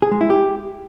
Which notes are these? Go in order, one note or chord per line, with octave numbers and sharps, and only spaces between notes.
G#4
G#3
E4
G4